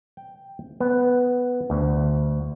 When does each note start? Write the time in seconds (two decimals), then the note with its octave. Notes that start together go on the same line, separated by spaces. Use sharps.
0.17 G5
0.80 B3
1.70 D2